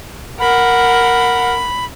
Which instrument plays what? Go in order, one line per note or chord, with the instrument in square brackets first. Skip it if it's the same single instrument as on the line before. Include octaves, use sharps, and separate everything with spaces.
[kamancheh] A#4 F#5 [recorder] B5